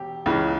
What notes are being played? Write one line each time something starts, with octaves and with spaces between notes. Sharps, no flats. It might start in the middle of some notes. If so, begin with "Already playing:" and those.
Already playing: E1 G4
C#2 C#3 E3